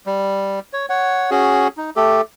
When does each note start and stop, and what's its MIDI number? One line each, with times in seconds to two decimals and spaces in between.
0.06 0.60 55
0.73 0.86 73
0.89 1.30 73
0.89 1.30 78
1.31 1.68 61
1.31 1.68 66
1.31 1.68 68
1.77 1.90 63
1.96 2.21 57
1.96 2.21 67
1.96 2.21 69